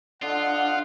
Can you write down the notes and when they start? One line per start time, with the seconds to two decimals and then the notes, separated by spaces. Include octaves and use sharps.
0.22 D3 D4 F4 D#5 F#5